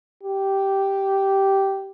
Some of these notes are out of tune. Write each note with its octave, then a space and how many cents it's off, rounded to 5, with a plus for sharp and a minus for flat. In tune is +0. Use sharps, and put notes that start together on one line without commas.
G4 -10